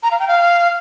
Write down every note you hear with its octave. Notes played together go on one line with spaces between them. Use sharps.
A#5
F5
G5
F5